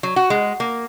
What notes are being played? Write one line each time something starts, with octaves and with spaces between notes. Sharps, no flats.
F#3
F#4
G#3
A#3